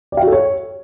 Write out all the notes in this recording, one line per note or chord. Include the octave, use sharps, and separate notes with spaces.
D5
F5
F#4
A4
C#5